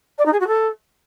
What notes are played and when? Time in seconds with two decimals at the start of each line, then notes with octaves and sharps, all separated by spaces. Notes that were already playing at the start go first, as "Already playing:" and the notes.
0.18 D5
0.26 D#4
0.33 G#4
0.40 F#4
0.47 A4